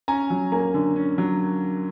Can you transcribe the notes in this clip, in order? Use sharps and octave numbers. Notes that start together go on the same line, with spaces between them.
C#4 G#5 A#5
F#3
A#3 G#5 A#5
D3
C#4
F#3